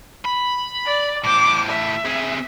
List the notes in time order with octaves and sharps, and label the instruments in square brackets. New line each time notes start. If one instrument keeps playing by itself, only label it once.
[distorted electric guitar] B5
[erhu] D5
[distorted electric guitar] A2 C5 [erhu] D6
[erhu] E5
[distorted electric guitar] C3 G#4